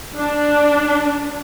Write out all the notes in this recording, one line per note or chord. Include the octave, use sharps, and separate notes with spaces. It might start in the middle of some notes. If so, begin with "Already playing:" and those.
D4